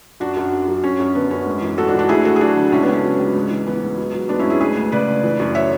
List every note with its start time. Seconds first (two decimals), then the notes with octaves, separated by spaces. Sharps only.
0.20 F#2 D4 F#4
0.37 F#2
0.52 F#3
0.68 F#2
0.84 F#2 C#4
0.99 F#2
1.15 D3 B3
1.31 F#2 C#4
1.46 G#2
1.62 E3
1.78 G#2 F#4 A4
1.88 D4 F#4
1.94 E3
1.99 D4 F#4
2.09 D2 E4 G#4
2.25 D2 F#4 A4
2.36 G#4
2.41 F#3 D4 F#4
2.56 D3
2.72 C#2 C#4 E4
2.82 B3 D4
2.88 C#2
2.93 C#4
3.03 F#3
3.19 C#2
3.35 G#2
3.51 E3
3.67 E3 B3
3.82 G#2
3.98 F#3
4.14 F#3
4.29 G#2 B3 D4
4.40 C#4 E4
4.45 G#2
4.50 E4 G#4
4.61 D2 G#4 B4
4.77 D2
4.92 C#3 B4 D5
5.07 D2
5.24 E3
5.40 F#2
5.55 C#5 E5